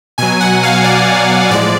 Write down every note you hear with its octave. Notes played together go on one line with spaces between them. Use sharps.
B2 F#3 G#5
F#5
F5
D5
A2 F3 G#3 D5